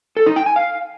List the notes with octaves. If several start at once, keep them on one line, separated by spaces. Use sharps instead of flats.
A4
D#4
G5
G#5
F5